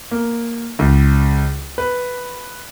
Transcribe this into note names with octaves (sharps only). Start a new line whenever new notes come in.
A#3
C#2
B4